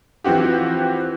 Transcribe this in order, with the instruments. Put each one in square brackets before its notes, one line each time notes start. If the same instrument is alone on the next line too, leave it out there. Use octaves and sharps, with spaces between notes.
[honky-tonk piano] E3 F3 C4 F#4 G4